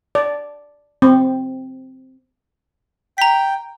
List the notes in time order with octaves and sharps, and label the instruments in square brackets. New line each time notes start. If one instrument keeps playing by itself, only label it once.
[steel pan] D5
C4
[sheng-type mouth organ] G5 [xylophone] A#5 B6